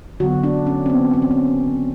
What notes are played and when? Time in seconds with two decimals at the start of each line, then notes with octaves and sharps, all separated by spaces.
0.20 D3 F#3 B3 F#4
0.44 D4
0.67 C#4
0.86 C4
0.90 B3
1.13 C4
1.22 C#4
1.31 C4